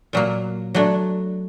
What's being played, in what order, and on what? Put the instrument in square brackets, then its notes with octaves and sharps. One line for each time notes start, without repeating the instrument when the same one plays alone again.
[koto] A#2 F#3 A#3
F#3 A3 D4